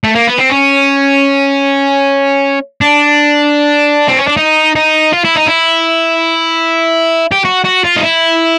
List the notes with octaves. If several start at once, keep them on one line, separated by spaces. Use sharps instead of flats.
A3
A#3
B3
C4
C#4
D4
C4
C#4
D4
D#4
D#4
F4
E4
D#4
E4
G4
F#4
F#4
F4
D#4
E4